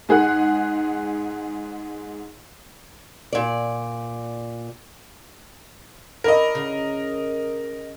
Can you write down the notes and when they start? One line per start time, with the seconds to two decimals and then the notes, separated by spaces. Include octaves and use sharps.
0.09 G#2 G#4 F#5 F#6
3.33 A#2 D5
6.24 D4 E4 A#4 D#5
6.55 C#3